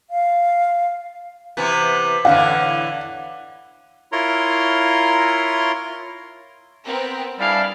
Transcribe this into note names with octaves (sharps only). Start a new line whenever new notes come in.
F5
C3 E3 B3
A2 D3 E3 F5 F#5
E4 F4 A#4 C#5 A#5 C6
B3 C4 A#4
G3 D4 E4 G#4 F5